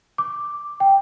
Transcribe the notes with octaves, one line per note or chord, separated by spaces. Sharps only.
D6
G5